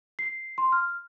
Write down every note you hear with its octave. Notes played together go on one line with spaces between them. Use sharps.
C7
C6
F6